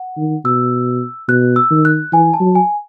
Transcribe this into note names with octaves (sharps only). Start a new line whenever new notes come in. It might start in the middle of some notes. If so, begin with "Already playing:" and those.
Already playing: F#5
D#3
B2 E6
B2 F#6
E6
D#3
F#6
E3 G#5
A5
F#3
G#5